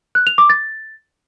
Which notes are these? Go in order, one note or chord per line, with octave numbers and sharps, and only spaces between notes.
F#6
F7
D6
A6